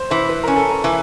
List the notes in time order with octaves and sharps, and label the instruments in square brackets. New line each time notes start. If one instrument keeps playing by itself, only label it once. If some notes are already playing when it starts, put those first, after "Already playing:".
Already playing: [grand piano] C5
[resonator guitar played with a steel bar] E3 [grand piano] C5
[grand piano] B4
[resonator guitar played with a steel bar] C#4 [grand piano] A#4
[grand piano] A4
A#4
[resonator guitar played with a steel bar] E3